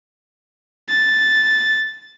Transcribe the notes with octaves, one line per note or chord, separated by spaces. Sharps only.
A6